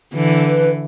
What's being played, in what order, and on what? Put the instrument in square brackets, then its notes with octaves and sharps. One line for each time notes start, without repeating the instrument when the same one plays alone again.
[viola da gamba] D3 E3
[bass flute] B4